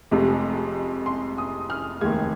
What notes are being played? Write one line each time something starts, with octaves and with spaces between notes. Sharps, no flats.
F1 F2 C3 G#3
C6
D#6
F6
F1 D#2 D#3 G#3 G#6